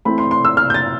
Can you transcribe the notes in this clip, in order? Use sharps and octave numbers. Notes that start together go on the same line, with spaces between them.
E3 A3 C4 B5
C6
C6
E6
F6
G6
A6